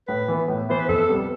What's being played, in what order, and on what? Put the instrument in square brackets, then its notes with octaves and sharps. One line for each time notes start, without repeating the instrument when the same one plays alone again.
[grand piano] A2 [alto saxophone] B4
[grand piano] E3 B3 E4
A2
[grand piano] E3 B3 E4 [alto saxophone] C5
[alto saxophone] B4
[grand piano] F2 [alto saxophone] A4
[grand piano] C3 G3 B3